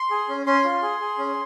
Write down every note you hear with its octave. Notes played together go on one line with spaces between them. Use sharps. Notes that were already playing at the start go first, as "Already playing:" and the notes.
Already playing: C6
G#4
C#4
C#4 C6
F4
G#4
G#4
C#4